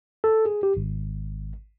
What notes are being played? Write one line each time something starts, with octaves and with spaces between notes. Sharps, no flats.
A4
G#4
G4
G#1